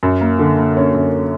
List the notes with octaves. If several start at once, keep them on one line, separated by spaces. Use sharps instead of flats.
F#2
A#3
D3
A#3
C#4
F#2